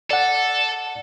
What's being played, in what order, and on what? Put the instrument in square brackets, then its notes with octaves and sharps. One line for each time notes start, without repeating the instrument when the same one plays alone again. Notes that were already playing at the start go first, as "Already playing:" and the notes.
[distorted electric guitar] A4 [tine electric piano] D5 F#5